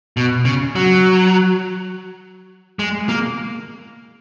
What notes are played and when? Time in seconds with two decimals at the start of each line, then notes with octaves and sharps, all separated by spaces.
0.17 B2
0.45 C#3
0.75 F#3
2.79 G#3
3.09 A#3